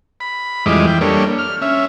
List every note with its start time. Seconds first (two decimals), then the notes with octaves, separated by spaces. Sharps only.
0.20 B5
0.66 F2 E3 G3 G#3 D#5 D6
0.87 E3 G5
1.01 G3 A#3 D4 A4 C#5
1.39 F6
1.62 C#4 E5